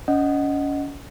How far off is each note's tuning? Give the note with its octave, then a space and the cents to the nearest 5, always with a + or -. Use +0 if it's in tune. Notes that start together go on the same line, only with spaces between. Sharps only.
C#4 +30 D#5 +0 F#5 +0